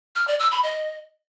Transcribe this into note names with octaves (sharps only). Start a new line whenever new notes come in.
F6
D5
E6
B5
D#5